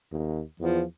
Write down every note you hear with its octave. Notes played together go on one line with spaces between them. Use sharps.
D#2
E2 F3